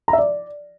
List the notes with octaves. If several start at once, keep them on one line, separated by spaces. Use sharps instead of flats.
A#5
E5
D5